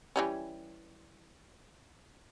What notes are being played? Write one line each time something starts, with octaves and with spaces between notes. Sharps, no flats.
E3 G3 C#4